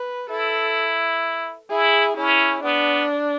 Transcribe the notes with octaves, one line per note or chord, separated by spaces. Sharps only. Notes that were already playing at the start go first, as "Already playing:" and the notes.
Already playing: B4
E4 A4
E4 G#4
C#4 E4
B3 D4